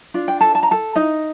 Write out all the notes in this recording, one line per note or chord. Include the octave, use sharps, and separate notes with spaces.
D4 F4
G5
A4 A5
A5
A#5
A4 A5
D#4 D#5